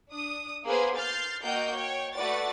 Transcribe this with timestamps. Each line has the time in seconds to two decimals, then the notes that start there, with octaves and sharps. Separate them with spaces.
0.10 D4 D#6
0.65 A#3 B3 G#4 B4 C5
0.96 F6 G6 A6 C7
1.42 A#3 F#4 D#5 G5 G6
1.74 C#5 G5
2.14 A3 F#4 B4 D5 A6